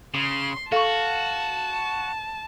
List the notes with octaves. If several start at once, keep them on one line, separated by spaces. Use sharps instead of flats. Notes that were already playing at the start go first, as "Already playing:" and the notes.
C#3 C6 D#6
F#4 A4 F5 A5 C#6